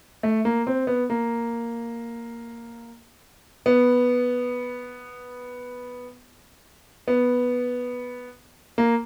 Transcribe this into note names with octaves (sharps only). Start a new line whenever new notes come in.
A3
A#3
C4
B3
A#3
B3
B3
A#3